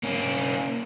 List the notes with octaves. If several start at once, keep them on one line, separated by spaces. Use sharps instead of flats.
A#3 C#4